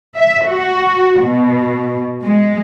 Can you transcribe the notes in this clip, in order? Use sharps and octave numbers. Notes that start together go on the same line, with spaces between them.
E5
F#4
B2
G#3